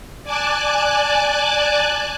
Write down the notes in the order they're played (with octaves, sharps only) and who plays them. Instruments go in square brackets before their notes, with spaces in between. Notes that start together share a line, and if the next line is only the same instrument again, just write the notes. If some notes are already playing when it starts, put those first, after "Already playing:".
[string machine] D5 G#5 A5 D6 F#6